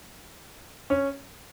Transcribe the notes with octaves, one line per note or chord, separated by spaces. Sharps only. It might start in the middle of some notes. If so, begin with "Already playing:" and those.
C#4